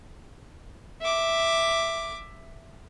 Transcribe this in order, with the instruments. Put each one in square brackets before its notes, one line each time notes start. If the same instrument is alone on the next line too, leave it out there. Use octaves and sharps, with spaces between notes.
[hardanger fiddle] E5 D6